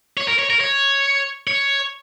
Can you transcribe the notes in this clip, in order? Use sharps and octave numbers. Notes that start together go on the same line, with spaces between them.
C#5
A#4
C#5
A#4
C#5
C#5